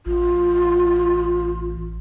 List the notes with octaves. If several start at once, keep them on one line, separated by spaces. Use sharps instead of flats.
A1 F4